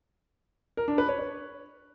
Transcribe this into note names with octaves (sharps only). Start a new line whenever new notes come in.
A#4
D4
B4
C#5
C#5